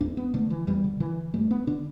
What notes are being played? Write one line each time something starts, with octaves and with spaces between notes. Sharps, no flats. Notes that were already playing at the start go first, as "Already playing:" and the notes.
E2 D4
B3
D3 A3
E3
E2 G3
D3
D3 E3
G2 A3
B3
D3 D4